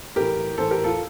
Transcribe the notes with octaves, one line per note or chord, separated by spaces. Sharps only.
A2 E3 G4 A#4
A2 E3 A4 C5
G4 A#4
F4 A4